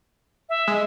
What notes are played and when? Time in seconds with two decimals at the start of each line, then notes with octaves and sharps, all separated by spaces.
0.49 E5
0.68 G#3